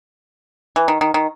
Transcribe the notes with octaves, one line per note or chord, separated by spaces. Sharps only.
E3
D#3
D#3
D#3